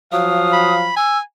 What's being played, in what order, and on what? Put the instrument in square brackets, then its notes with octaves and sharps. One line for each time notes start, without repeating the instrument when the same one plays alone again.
[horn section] F3 F#3 F5 [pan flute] D#6
[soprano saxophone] B5
[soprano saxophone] G#5 [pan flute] E6